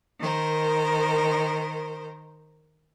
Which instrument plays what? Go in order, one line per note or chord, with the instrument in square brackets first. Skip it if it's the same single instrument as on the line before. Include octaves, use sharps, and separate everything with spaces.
[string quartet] D#3 A#4 C5